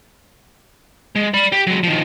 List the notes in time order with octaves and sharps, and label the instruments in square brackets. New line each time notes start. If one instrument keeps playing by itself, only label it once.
[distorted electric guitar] G#3
D5 B5
G4
F#3 G#3
D#3 F3